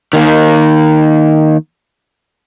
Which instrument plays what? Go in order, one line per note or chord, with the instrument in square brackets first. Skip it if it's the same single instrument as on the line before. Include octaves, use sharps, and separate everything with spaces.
[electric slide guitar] D#3 A#3